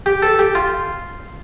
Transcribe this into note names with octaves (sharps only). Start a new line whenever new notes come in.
G4
A4
G4
F4